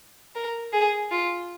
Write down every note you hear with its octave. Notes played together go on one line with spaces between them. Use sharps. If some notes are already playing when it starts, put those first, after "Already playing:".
A#4
G#4
F4